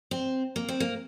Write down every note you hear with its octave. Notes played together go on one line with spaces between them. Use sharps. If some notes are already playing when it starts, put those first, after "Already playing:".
C4
A#3
C4
A#3